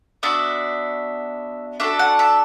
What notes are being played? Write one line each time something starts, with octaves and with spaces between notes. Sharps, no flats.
B3 D4 F#4 E5
D4 F#4 A4 E5
F#5
E5